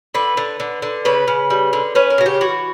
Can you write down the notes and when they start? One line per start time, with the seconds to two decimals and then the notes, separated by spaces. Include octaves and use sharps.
0.14 D3 B4
0.37 D3
0.60 D3
0.82 D3
1.05 C#3 B4
1.28 C#3
1.50 G3
1.73 D3
1.95 C#4 B4
2.10 A#4
2.18 C#3 F#4
2.26 G4
2.41 E3 F#4